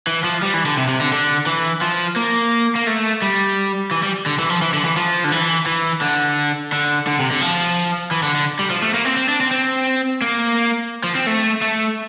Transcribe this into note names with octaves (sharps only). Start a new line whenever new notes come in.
E3
F3
G3
E3
D3
C3
C3
D3
D3
E3
F3
A#3
A#3
A3
G3
E3
G3
D3
E3
F3
E3
D3
E3
F3
D3
E3
E3
D3
D3
D3
C3
D3
F3
E3
D3
D3
G3
F3
A3
A#3
C4
C4
D4
C4
C4
A#3
F3
C4
A3
A3